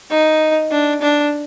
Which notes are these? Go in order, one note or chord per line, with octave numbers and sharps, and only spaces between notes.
D#4
D4
D4